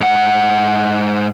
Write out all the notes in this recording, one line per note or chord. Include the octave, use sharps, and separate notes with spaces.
G#2 F#5